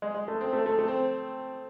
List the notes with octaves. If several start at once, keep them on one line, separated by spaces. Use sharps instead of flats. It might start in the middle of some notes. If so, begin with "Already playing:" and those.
G#3
G#3
A3
C4
A3
A3
A3
C4